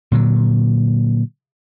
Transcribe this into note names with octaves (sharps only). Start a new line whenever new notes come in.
A#2 D3 F#3